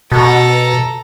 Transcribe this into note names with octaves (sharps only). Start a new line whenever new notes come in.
B2 A4 A#5